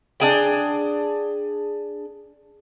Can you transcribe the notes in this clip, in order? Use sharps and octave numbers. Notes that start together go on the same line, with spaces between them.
D4 G#4 G5